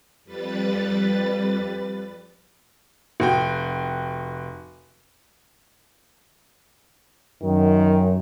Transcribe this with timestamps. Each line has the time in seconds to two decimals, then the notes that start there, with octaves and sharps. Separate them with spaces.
0.24 F2 G3 B4 A6
3.20 F1 F#4 G5
7.43 F#2 D#3